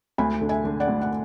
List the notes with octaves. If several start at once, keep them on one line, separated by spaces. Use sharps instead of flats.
D2 G#5 B5
D3
E5 G#5
D3
D5 F#5
D2
F#5